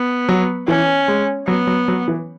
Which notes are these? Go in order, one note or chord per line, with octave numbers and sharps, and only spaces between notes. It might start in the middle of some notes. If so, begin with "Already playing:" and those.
Already playing: B3
F#3
E3 C#4
G#3
F#3 B3
F#3
F#3
E3